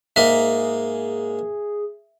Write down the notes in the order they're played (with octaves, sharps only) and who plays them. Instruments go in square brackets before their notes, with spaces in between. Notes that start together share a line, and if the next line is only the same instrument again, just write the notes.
[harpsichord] G#2 A#3 D#5 [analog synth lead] G#4 [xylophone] E5